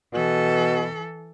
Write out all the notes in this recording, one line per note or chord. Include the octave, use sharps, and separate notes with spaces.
B2 E3 A4